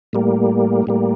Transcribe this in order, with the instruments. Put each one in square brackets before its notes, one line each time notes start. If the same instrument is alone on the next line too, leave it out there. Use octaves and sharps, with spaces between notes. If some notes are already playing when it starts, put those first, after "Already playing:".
[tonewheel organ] A2 G3 A#3
A2 G3 A#3